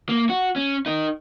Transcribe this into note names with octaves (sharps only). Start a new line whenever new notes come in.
A#3
F#4
C#4
D#4 A#4